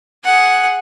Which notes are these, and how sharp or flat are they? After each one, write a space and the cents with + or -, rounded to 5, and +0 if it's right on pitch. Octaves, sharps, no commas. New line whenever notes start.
G#4 +0 F#5 +0